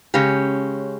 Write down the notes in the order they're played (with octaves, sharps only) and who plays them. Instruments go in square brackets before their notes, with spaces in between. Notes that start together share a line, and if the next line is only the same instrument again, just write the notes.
[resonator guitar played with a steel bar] C#3 G#3 C#4 G4